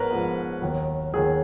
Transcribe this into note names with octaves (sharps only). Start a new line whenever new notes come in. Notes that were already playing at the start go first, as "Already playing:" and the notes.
Already playing: G#2 F3 B3 A#4 B4 C#5
G#2 F3 B3
D#2 D#3 F#3
D#2 D#3 F#3 G#4